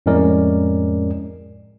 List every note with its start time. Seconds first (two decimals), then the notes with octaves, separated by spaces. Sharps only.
0.06 F2 A2 G#3 C#4 A#4 D5